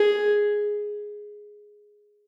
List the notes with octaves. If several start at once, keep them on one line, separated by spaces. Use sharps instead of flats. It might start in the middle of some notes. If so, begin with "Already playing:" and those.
Already playing: G#4